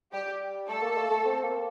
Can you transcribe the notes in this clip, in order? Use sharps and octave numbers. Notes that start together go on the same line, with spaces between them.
G3 G4
A3 A4
A#3
A3
A3
C4
A#3